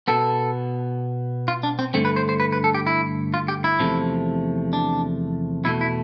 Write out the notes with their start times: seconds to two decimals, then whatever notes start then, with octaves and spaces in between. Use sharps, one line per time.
0.08 B2 B3 A4
1.48 F4
1.63 D4
1.79 C4
1.94 G2 D3 A3 C4
2.05 B4
2.16 C5
2.29 C5
2.40 B4
2.52 B4
2.64 A4
2.74 G4
2.87 E4
3.34 F4
3.48 G4
3.64 E4
3.79 E2 C3 F3 A3
4.73 D4
5.65 E2 B2 A3 E4
5.81 E4